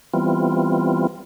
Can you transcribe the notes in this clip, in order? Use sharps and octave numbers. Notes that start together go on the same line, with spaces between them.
E3 G3 B3 C4 F4